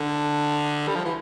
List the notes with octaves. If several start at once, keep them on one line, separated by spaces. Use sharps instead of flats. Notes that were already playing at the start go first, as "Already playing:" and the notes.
Already playing: D3
G3
F3
E3